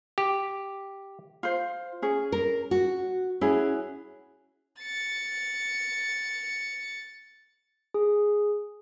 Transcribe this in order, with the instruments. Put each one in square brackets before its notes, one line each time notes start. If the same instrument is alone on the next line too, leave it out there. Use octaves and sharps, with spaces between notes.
[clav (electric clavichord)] G4
[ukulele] F4 C5
C#4 G#4
[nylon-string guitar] A#4
F#4
[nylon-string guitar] C#4 [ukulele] E4 F#4 G#4
[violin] A6 C#7
[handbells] G#4